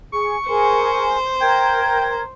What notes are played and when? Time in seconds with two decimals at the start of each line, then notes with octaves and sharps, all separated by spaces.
0.12 G#4 C#6
0.49 G#4 A#4 C5 G#5
1.40 A#4 G5 A#5 G#6